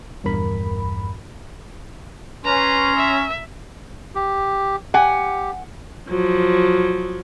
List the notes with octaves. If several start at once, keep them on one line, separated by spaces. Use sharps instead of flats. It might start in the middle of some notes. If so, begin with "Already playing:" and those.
A#1 E2 G2 A#4 B5
C#4 B4 A#5 C6
E5
G4
G4 F#5 G#5
F3 F#3